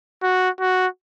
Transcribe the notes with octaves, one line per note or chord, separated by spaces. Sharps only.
F#4
F#4